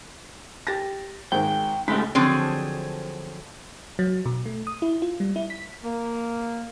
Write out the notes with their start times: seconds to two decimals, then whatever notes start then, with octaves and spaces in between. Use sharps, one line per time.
0.67 G4 A6 A#6
1.32 G#1 D#3 G#3 G5
1.88 C#3 G#3 A3 G4 B5 B6
2.15 D3 F3 F#3 C4 G#4
3.99 F#3
4.26 B2
4.46 A3
4.67 D#6
4.82 E4
5.02 F4
5.20 G3
5.36 E4
5.50 B6
5.84 A#3